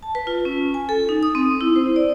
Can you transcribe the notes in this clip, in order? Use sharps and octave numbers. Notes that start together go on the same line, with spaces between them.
A5
B4
F4
C#4
G#5
A4
D#4
D#6
C4
E4
C5
D5